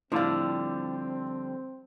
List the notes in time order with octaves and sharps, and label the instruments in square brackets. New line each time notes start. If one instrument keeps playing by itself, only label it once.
[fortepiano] A2 F5 [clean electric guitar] D3 [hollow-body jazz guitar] F3 G3 [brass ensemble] C4